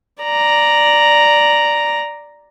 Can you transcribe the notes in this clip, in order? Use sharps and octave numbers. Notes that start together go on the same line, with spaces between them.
D5 A#5